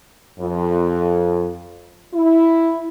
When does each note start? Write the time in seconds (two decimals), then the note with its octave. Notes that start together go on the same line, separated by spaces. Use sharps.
0.40 F2
2.14 E4